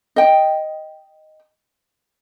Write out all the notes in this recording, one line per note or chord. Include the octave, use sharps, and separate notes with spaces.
D#5 G5